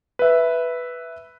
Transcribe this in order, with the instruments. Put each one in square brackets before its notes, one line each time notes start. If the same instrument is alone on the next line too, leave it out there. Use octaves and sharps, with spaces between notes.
[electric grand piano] B4 E5